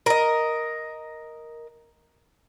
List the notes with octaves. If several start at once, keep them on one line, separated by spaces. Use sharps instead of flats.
A#4 D#5